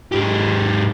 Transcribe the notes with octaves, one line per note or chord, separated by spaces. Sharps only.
G#2 G4